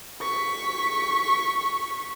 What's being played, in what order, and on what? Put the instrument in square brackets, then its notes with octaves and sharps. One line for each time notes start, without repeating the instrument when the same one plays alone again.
[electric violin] C#6 B6